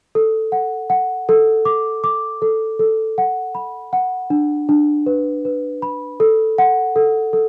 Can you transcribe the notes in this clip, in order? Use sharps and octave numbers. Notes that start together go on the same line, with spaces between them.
A4
F#5
F#5
A4
D6
D6
A4
A4
F#5
B5
F#5
D4
D4
B4
B4
B5
A4
F#5
A4
A4